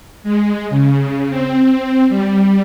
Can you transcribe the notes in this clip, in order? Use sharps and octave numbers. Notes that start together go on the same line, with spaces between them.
G#3
C#3
C4
G3